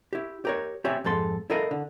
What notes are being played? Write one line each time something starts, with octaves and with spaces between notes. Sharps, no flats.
E4 G4
G4 A#4 C#5
C4 G4 C#5 E5 G#5
F2 G#2 A4 C6
E4 A4 A#4 D#5 F5
D3